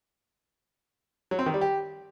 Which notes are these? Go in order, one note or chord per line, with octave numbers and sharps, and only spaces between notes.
F#3
C4
D#3
G3
G4